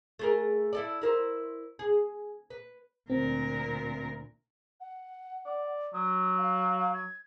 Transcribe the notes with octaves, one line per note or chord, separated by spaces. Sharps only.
A3 G#4 A#4
E4 A4 D5
E4 A#4 C5
G#4
B4
D2 A#2 C4 A#4
F#5
D5
F#3 D#6
F5
G#6